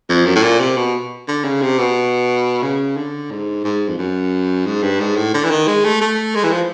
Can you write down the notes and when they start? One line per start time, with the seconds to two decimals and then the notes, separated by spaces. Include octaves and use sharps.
0.09 F2
0.26 F#2
0.36 A2
0.43 A#2
0.60 C3
0.77 B2
1.28 D3
1.44 C#3
1.62 C3
1.79 B2
2.62 C#3
2.97 D3
3.31 G#2
3.64 G#2
3.88 F2
3.98 F#2
4.66 G#2
4.83 G2
5.00 G#2
5.17 A2
5.34 D3
5.44 E3
5.51 D#3
5.67 G#3
5.85 A3
6.01 A3
6.35 G#3
6.44 E3
6.52 F3